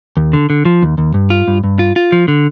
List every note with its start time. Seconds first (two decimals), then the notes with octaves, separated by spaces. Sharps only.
0.17 D#2
0.33 D3
0.50 D3
0.65 F3
0.82 D#2
0.98 D#2
1.14 G2
1.30 F4
1.48 G2
1.64 G2
1.79 F4
1.96 F4
2.12 F3
2.28 D3